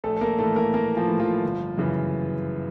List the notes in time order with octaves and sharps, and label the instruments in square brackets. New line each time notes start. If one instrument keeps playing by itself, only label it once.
[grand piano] A#1 A3 A4
A4
A#3 A#4
A2 E3 A3 A4
A#3 A#4
A#1 A#3 A#4
F3 F4
A2 E3
F3 F4
G1
F#2 C#3 E3